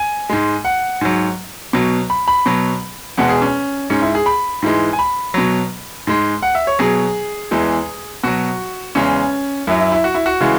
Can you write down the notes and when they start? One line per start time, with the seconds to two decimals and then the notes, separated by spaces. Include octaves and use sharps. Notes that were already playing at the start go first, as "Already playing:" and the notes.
Already playing: G#5
0.29 G#2 G#3
0.65 F#5
1.01 G#2 F#3
1.73 B2 F#3
2.10 B5
2.28 B5
2.46 B2 F#3
3.18 E2 B2 G#3 F#5
3.29 G#4
3.42 C#4
3.90 G#2 G#3 C#4
4.02 E4
4.15 G#4
4.26 B5
4.62 G#2 E3 G#3
4.93 G#5
4.99 B5
5.34 B2 F#3
6.07 G#2 G#3
6.42 F#5
6.55 E5
6.67 C#5
6.79 B2 F#3 G#4
7.51 E2 E3 G#3
8.23 B2 F#3 F#4
8.95 E2 C#3 G#3 C#4
9.67 F#2 F#3 E4
9.80 E4
9.92 E4
10.04 F#4
10.15 E4
10.26 F#4
10.40 C#3 E3 G#3